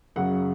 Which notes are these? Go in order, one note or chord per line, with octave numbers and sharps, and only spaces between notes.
F#2 C#3 F#3 F#5